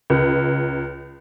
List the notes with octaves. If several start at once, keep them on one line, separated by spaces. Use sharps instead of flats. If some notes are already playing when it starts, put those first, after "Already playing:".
C#2